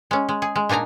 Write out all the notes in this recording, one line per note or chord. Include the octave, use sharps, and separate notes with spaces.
G#3 C#4
G#3
G#4
G#3
A#2 D4 D#4 G#5 A#5